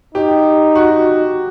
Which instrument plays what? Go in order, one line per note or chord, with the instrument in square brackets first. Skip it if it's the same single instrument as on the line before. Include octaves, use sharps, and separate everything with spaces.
[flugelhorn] D#4 [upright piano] G4
[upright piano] F#4